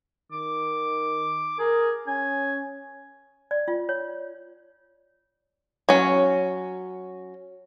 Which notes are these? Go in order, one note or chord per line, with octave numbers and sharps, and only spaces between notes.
D#3 D6
G#4 A#4
C#4 G#5
D5
F4
C#5
F#3 C#4